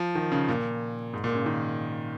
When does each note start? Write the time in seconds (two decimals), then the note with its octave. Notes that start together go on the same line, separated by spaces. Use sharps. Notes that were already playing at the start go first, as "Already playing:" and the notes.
Already playing: F3
0.15 D#3
0.32 C#3
0.48 A#2
1.13 G#2
1.24 A#2
1.35 C#3
1.46 D#3